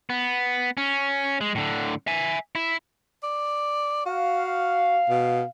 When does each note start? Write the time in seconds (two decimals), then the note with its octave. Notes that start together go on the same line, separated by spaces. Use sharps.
0.10 B3
0.77 C#4
1.41 G#3
1.55 A2 D3
2.07 E5 G#5
2.55 E4
3.23 D5
4.06 F#4 F5
5.10 B2